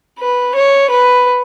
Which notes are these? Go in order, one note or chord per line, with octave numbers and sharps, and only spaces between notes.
B4
C#5
B4